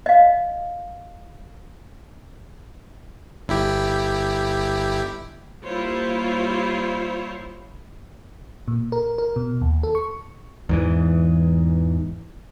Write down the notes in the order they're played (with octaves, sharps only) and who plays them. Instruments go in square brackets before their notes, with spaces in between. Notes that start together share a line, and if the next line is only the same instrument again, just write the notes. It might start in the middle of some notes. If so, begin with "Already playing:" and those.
[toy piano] D#5 F5
[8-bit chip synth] G1 E4 G4
[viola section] G3 A#3 E4 F4 C5 C#5
[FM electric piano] A#2
A#4
A#4
B2
D#2
A4
C#6
[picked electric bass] E2 G#2 E3